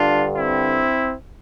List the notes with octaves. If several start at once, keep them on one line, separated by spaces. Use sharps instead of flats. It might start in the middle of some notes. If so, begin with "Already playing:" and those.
Already playing: G2 D3 D4 F4
C4 E4